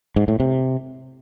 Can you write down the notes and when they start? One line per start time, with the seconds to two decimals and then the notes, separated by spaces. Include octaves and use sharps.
0.16 G#2
0.28 A2
0.40 C3